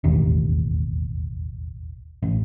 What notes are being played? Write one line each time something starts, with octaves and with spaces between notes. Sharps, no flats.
E1 A1 D#2
A1